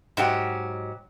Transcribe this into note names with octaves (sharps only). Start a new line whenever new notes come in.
G#2 F#3 G4 F#5